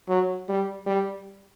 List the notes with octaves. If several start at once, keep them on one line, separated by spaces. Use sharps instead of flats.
F#3
G3
G3